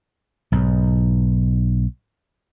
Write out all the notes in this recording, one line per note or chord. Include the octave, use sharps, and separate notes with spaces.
B1 G#2